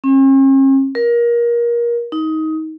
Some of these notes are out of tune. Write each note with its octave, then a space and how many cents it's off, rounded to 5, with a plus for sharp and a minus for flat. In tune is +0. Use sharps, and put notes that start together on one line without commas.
C#4 -45
A#4 +25
D#4 +20